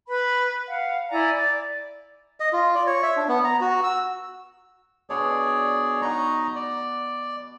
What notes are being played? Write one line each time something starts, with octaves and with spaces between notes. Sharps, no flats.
B4 B5
F5 F#5
E4 D5 G#5 A#5
D5
D#5
F4
D5
C#5
E5
D4
B3
A#5
F#4
E6
B2 D3 B3 G#4 C#5 D5
D#4 D#5 F#5 A#5 B5 C#6
D5